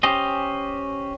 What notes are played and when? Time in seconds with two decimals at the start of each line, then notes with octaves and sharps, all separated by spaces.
0.03 C#4 G4 C5 D#5